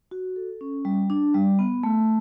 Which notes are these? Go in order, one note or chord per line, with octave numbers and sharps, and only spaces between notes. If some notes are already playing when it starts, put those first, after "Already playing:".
F#4
A4
C#4
G3
D4
G3
B3
A3